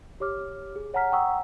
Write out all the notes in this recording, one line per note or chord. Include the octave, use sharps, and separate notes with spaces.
G4 C#5 D6 F6
G#4
C#5 F#5 G#5 A#5 F6 B6
F#5 G5 A#5 C#6 D#6 E6